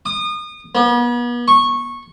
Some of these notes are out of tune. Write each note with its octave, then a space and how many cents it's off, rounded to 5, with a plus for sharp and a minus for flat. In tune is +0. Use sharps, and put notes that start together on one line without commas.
D#6 -30
B3 -40
C#6 -15